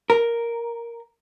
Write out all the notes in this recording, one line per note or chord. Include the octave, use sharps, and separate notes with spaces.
A#4